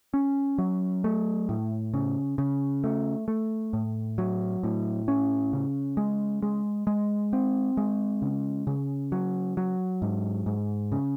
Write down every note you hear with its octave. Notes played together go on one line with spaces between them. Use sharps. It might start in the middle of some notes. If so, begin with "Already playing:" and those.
C#4
F#3
A3
A2
C#3
C#3
A3
A3
A2
F#3
A2
C#4
C#3
G#3
G#3
G#3
C4
G#3
C#3
C#3
F#3
F#3
G#2
G#2
C#3